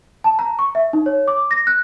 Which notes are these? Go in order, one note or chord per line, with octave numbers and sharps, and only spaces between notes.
A5
A#5
C#6
E5
D#4
C#5
D6
A#6
F#6